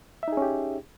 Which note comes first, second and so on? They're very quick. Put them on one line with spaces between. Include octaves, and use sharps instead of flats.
E5 D#4 G#4 C#4 G4